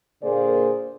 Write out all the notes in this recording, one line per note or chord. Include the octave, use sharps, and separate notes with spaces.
A#2 D3 A#3 G#4 C5 D5